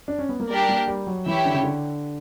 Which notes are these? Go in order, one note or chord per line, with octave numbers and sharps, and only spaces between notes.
D4
C#4
B3
A#3
G3 D4 G4 A#4 D5
A#3
G3
F#3
E3 E4 G4 C#5 E5 G5
D3
C#3
D3